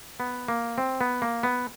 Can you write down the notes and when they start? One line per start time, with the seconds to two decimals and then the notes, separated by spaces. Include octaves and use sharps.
0.20 B3
0.48 A#3
0.78 C4
1.01 B3
1.22 A#3
1.43 B3